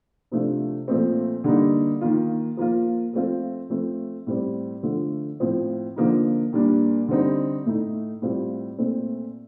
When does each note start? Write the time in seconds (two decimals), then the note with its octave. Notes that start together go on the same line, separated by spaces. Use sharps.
0.32 C3 F3 A3 D4 F4
0.88 A#2 F3 A3 C4
1.44 D3 G3 A#3 D#4
2.01 D#3 A#3 F4
2.57 F3 A#3 F4
3.13 F3 A3 C4 F4
3.70 F3 A3 C4
4.27 A2 G3 C4
4.83 D3 F3 A3
5.40 A2 F3 C4
5.96 D3 F3 A#3 D#4
6.53 A#2 G3 A#3 D4
7.08 D3 G3 C4 D#4
7.66 A2 A3 D#4
8.22 A2 G3 C4 F4
8.78 A#2 A3 C4